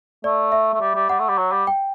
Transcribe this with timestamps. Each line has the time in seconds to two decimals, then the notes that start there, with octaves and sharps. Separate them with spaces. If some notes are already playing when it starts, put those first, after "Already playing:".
0.24 A3 D5
0.52 E5
0.74 A3
0.81 G3
0.95 G3
1.09 G3 F#5
1.19 A3
1.28 G3
1.38 F#3
1.52 G3
1.67 G5